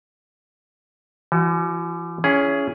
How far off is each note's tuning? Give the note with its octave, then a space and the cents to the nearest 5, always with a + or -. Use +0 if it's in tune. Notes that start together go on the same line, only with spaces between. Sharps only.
E3 +45 F#4 +15
C#4 +15 E4 +30 G#4 +0